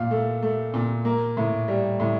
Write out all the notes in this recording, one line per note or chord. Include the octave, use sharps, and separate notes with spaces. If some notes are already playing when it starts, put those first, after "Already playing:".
Already playing: A#2 F5
A3
A3
A#2
A#3
A2
G3
A2